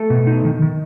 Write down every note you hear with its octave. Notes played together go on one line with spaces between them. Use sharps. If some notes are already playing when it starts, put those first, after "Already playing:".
Already playing: A3 A4
B2
D#4
D#3
D#3